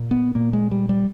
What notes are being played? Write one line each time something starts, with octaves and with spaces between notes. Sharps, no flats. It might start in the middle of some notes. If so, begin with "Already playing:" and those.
Already playing: A#2
B3
A#2 A#3
G#3
G3
G3